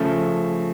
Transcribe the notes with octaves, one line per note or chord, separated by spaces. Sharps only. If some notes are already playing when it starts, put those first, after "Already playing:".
Already playing: C#3 F3 A3